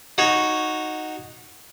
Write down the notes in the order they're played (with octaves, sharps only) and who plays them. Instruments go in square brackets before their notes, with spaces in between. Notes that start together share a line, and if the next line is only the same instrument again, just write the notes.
[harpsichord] D#4 F#4 C#5